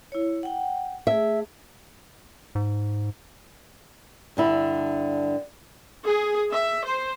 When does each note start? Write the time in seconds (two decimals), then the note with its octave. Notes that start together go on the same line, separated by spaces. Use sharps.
0.12 E4 C#5
0.43 F#5 G5
1.07 A3 G#4 E5
2.55 G#2
4.37 G2 D3 E4
6.05 G#4
6.50 E5
6.83 C5